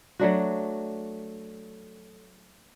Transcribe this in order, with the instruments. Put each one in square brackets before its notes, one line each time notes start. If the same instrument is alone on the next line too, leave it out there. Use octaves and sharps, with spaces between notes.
[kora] F#3 A3 D4 F#4